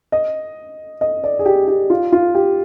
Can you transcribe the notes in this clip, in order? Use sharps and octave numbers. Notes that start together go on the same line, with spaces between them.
D#5
D#5
D5
G#4
G4
G4
F4
F4
G4